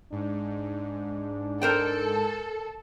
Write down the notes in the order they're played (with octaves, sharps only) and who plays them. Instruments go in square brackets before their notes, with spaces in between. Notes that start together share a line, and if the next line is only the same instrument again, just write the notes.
[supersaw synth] G#2 [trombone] D4
[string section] A4 [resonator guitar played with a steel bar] A#4 C5 G5